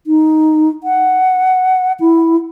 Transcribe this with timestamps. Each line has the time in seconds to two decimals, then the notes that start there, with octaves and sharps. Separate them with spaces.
0.07 D#4
0.84 F#5
2.00 E4